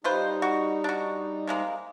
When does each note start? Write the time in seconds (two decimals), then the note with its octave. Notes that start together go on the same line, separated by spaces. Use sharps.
0.04 G3 D#4 F4 B4 C5
0.42 F#4
0.84 D4 F#4
1.47 C3 G#3 A#3